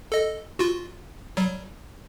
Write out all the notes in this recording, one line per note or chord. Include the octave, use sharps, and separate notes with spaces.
A4 D#5
F4 F#4
F#3 G3